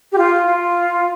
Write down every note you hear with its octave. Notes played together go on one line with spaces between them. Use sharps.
G4
F4
F4